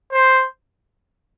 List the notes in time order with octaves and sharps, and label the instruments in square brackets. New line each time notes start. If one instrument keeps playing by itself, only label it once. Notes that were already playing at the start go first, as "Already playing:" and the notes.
[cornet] C5